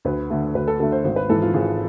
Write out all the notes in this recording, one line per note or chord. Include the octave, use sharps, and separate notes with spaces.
D2 B4
D3 A3
D2 B4
A4
D3 A3 A4
C5
G#1 C5
B4
G#2 E3 G#3 A4
F4
G#1 G#4